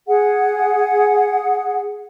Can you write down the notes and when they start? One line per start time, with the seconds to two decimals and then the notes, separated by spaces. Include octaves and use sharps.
0.07 G#4 F#5